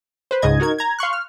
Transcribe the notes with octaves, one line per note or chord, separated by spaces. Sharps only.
B4 C5
C#2 G#2 C#3 D#5 G#6
D#4 F#4 A#4 G#6
A#5 G#6
F5 C6 C#6 F#6
F6